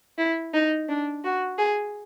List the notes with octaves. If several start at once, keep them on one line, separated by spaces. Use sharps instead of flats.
E4
D#4
D4
F#4
G#4